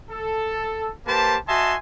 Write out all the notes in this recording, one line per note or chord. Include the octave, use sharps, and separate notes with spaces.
A4
A#3 G4 B4 C5 A5
F#4 D#5 E5 G#5 A5 C6